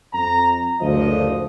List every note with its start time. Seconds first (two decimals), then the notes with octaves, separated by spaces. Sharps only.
0.13 F2 A#5
0.81 F#1 D2 F3 D#5